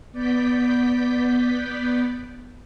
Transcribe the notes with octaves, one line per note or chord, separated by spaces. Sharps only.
B3 D5 G6 B6